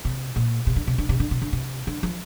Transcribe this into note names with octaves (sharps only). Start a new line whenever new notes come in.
C3
A#2
C3
D3
C3
D3
C3
D3
C3
D3
C3
D3
F3